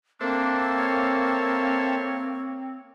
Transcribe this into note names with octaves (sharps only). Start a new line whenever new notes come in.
A#3 C4 D4 A4 C5 E5
C#5